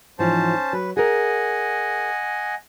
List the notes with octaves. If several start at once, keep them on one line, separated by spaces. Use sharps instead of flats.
G#2 E3 F3 C#4 C5 A5
F#3 B4
G#4 A#4 D#5 F#5 G#5